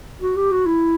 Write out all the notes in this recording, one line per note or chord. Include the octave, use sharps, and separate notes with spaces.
F#4
G4
F#4
E4